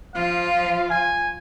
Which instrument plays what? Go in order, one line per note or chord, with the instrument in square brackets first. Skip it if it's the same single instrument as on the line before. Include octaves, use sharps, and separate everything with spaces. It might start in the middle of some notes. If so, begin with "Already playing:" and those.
[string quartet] F3 F4 [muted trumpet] F5
[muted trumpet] G#5